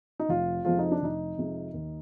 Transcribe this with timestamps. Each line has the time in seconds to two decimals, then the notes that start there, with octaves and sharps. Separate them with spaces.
0.19 D#4
0.29 F1 F4
0.65 F2 C3 F3 G#3 F4
0.79 D#4
0.91 D4
1.02 F1 D#4
1.37 F2 C3 F3 G#3
1.73 D#2